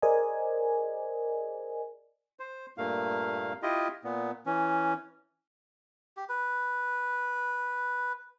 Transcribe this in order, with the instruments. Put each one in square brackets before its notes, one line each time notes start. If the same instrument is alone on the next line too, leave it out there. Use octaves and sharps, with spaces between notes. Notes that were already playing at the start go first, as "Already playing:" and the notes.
[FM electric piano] G#4 A#4 C5 D5 D#5 G#5
[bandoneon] C5
G2 A#2 A3 A#3 F5
E4 F4 G4 D#5
A#2 B3
E3 C#4
[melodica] G4
B4